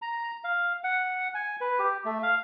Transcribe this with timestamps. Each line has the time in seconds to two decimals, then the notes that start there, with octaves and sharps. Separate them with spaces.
0.02 A#5
0.44 F5
0.84 F#5
1.34 G#5
1.61 B4
1.79 G4
2.05 A3
2.23 F5